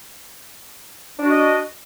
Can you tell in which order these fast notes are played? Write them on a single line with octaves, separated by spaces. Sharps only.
D4 F#4 D#5